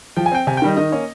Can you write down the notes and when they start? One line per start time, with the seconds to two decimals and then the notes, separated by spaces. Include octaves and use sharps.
0.16 F3 G5
0.26 G#5
0.32 C4 G5
0.47 C3 G#5
0.57 G5
0.62 D#3 G3 D#5
0.76 D#3 D#5
0.92 A#3 C#4